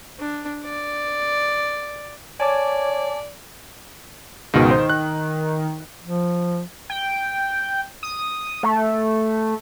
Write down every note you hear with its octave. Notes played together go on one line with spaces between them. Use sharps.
D4
D5
C#5 D5 G#5 A5 D6
C#2 G#2 B2 D#3
C5
F#6
F3
G5
D#6
A3